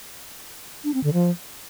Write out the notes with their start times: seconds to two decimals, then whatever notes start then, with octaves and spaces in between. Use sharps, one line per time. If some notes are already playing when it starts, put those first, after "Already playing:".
0.84 D4
0.94 C4
1.04 D3
1.13 F3